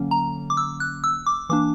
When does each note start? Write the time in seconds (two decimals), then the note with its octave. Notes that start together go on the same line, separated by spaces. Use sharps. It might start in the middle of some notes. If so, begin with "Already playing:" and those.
Already playing: D3 F#3 A#3 C#4
0.11 A#5
0.50 D6
0.57 E6
0.80 F#6
1.04 E6
1.27 D6
1.49 E3 A#3 D4 D6